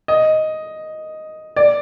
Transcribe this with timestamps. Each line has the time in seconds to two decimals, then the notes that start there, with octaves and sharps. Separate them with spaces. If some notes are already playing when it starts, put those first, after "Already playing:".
0.08 D#5
1.56 D5